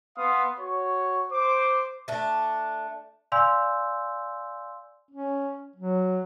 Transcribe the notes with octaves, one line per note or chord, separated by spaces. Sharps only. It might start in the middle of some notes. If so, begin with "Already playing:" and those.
B3 F5 C6 D#6
F#4 C#5 C#6
C5 D6
A3 D4
D5 F5 G#5 C6 E6 G6
C#4
F#3